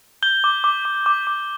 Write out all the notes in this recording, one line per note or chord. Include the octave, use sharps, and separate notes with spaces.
G6 G7
D6
D6
D6
D6
D6